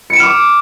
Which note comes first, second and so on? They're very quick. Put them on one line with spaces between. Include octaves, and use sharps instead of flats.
C#7 D7 E7 F6 D6